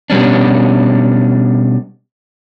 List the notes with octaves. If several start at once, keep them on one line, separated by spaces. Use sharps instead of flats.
B2 G3 C#4 D4